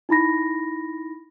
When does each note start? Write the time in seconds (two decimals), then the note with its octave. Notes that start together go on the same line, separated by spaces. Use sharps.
0.09 D#4 E4 B5 A#6